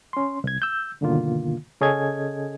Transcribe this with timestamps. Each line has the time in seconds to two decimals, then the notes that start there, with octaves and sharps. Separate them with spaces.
0.13 C#4 C6
0.44 C2 G#6
0.62 E6 G6
1.01 G2 B2 D3 D#3 A#3 F4
1.81 C#3 C#4 G#4 A4 D#5 G#6